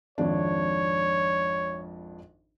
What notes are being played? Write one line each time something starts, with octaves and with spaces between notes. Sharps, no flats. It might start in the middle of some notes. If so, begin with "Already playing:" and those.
G#1 F2 D4 C#5